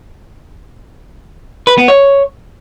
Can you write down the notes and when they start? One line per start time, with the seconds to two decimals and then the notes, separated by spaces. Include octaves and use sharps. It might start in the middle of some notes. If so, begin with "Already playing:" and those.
1.67 B4
1.78 B3
1.88 C#5